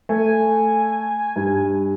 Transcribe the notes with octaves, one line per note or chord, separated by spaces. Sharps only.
A3 G#5
G2